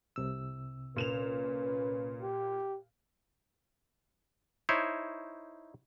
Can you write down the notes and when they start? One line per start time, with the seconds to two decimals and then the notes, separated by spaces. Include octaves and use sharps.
0.16 C2 C3 E6
0.96 A#2 C#4 B4 E7 F7
2.22 G4
4.69 D#4 E4 C5 C#5